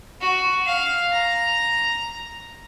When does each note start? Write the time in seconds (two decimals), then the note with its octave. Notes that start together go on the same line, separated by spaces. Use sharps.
0.21 F#4
0.66 F5
1.12 A#5